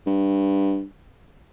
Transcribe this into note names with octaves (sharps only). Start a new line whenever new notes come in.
G2